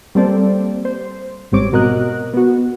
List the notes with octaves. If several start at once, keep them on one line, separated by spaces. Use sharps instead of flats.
G3 A#3 C4 A4 C5 D5
C5
G#1 G#2 G3 C4 C#5 D6
B2 F#4 A#4 D#5 F#6
B3 F#4